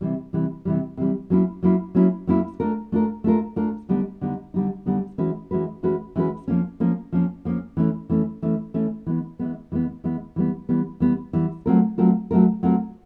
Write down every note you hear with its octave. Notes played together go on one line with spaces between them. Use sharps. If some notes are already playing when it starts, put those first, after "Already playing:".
C3 E3 G3
C3 E3 G3
C3 E3 G3
C3 E3 G3
F#3 A#3 C#4 E4
F#3 A#3 C#4 E4
F#3 A#3 C#4 E4
F#3 A#3 C#4 E4
A3 D4 F4 A#4
A3 D4 F4 A#4
A3 D4 F4 A#4
A3 D4 F4 A#4
D3 G3 B3 D#4
D3 G3 B3 D#4
D3 G3 B3 D#4
D3 G3 B3 D#4
E3 G#3 C#4 F#4 B4
E3 G#3 C#4 F#4 B4
E3 G#3 C#4 F#4 B4
E3 G#3 C#4 F#4 B4
F3 A#3 C#4
F3 A#3 C#4
F3 A#3 C#4
F3 A#3 C#4
E3 A3 C#4
E3 A3 C#4
E3 A3 C#4
E3 A3 C#4
E3 G#3 B3
E3 G#3 B3
E3 G#3 B3
E3 G#3 B3
E3 G3 B3
E3 G3 B3
E3 G3 B3
E3 G3 B3
F#3 A3 C4 F4 A#4
F#3 A3 C4 F4 A#4
F#3 A3 C4 F4 A#4
F#3 A3 C4 F4 A#4